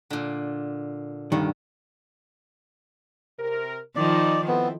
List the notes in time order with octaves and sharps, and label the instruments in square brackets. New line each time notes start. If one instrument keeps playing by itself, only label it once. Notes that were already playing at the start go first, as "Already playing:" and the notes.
[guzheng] A#2 D3
[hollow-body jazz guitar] C2 G2 D#3 [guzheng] D3
[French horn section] C3 A#4
[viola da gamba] D#3 F3 [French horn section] D#4 [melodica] D5
[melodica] B3 [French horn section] C4 E4 A4